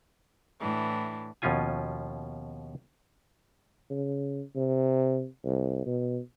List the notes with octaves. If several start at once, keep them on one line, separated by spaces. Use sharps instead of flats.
A2 E3 D4
D#2 B2 F3 C#4 F4 G#5
C#3
C3
C2
B2